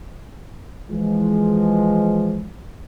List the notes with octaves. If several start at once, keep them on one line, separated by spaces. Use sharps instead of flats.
E3 F3 G#3